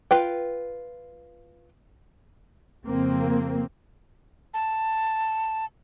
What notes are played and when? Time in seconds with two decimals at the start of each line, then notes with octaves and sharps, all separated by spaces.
0.11 F4 B4 G5
2.86 F2 C#3 A#3 C4
4.54 A5